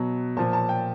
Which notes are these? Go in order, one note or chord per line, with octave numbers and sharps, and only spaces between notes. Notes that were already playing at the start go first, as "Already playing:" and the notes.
Already playing: B2 F#3
A#2 F3 A5
A5
G5